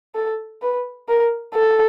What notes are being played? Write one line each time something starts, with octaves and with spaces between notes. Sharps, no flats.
A4
B4
A#4
A4